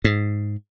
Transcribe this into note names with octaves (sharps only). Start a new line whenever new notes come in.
G#2